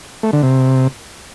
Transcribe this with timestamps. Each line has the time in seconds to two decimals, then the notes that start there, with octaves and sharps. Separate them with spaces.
0.23 A3
0.33 D3
0.43 C3